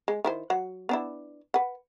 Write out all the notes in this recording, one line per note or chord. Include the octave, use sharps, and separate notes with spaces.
G#3
D#3 E4 C5
F#3 F#5
B3 D4 E4
B4 F#5